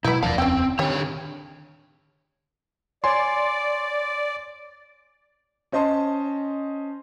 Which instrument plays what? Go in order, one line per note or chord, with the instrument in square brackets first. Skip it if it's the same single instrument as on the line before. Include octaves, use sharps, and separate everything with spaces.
[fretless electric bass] B2 F#3 G#3 [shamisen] B3 D#4 [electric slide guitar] E4
[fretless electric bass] F1 D#2 F3 [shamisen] D4 [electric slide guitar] D5 E5 F5
[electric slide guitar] C4 [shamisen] C#4 G5
[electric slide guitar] D3 C#5 [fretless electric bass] D#3 [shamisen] G3
[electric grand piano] C#5 G#5 C6 [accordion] D5
[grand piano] C#4 C5 D#5 A5 C6